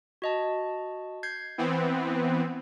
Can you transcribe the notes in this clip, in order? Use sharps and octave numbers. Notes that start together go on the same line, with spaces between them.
F#4 D#5 A5
G6 G#6 C7
E3 B3 C4